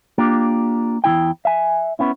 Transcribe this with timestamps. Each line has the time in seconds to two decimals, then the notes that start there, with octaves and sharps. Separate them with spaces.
0.18 A#3 D4 F4 G4
1.04 E2 E3 E4 G5
1.45 E5 G#5
1.99 B3 C#4 E4